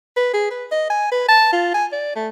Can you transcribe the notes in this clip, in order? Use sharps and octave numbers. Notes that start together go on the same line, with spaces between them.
B4
G#4
B4
D#5
G#5
B4
A5
F4
G#5
D5
A3